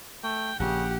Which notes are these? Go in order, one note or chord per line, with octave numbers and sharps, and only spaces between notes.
A3 G5
A#1 C#3 G4 F#5